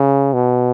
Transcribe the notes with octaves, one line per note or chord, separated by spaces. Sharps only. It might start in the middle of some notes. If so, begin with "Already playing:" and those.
Already playing: C#3
B2